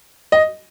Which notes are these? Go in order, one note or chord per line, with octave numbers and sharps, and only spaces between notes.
D#5